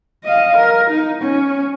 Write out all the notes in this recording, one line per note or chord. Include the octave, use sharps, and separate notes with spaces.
D#5 F5
A#4
D#4
C#4